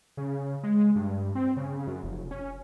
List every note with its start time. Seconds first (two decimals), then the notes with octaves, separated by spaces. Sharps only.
0.17 C#3
0.64 G#3
0.96 G2
1.35 C4
1.57 C#3
1.87 F#2
2.04 F1
2.31 C#4